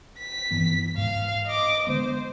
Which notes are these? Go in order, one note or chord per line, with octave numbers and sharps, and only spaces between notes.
B6
G2 E3 B3
G#2 F5
D#5 D6
D3 G#3 B3 C5